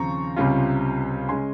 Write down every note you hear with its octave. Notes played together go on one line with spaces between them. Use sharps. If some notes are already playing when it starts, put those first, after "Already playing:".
Already playing: D#2 C#3 F3 C4 A#5 C#6
C#2 C3 G3 C#4 F4
C#3 G#3 C#4 G#5 C6